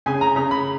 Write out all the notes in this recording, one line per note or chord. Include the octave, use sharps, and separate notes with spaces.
C#3 G#5
A#5
C#3 A#5
B5